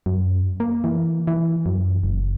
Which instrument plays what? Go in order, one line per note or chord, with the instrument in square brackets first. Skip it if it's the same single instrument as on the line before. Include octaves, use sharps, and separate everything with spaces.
[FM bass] F#2
A#3
E3
E3
F#2
F#1